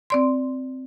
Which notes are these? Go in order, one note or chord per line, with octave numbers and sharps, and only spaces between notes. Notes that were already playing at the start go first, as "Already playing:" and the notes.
C4 D5 C6